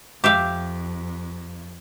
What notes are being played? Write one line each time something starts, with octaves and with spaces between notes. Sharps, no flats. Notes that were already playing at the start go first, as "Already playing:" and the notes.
F2 G4 E5 F5